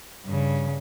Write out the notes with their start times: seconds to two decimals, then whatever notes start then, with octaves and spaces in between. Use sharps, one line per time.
0.25 G2 C#3